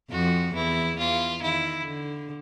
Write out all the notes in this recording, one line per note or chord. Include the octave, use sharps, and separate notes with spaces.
F2 F3 F#4
E2 E3 E4
E2 E3 F4
D#3 E4
D3